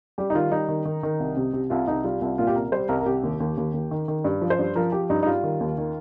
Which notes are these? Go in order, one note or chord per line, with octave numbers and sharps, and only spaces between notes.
G3 G4
D#4
D#3 F4
G3 D#4
D#3
D#3
D#3
C2
C3
C3
C2 F4
C2 D#4
G3 F4
C2 F4
A#2 F4
G4
C2 A#4
G3 C5
C2 A#4
A#4
C2 G4
D#2
D#2
D#2
D#2
D#3
D#3
G2
F3
C5
G2
F3 A#4
F3 G4
G2 D#4
D#4
G3 F4
D#3
D#2
D#3